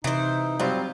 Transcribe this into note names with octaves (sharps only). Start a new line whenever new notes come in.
C3 E3 D#4 C5
F#3 G3 C4 F4